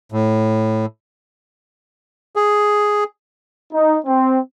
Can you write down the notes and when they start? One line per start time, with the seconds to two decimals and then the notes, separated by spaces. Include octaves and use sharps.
0.12 A2
2.36 G#4
3.71 D#4
4.07 C4